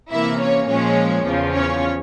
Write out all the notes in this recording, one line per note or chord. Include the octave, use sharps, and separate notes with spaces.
C3 E3 A#3 E4 E5
C#4 C#5
A#2 F3 G#3 C#4 C#5
E2 C#3 F3
C#4 C#5